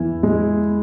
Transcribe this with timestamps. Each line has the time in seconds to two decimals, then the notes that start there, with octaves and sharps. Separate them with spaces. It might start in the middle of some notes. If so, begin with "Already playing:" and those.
Already playing: E2 E3 E4
0.23 G#3